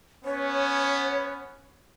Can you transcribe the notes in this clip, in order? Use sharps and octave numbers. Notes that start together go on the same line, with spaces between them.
B3 C#4 C#5